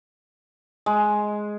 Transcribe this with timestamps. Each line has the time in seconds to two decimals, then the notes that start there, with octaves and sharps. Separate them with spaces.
0.86 G#3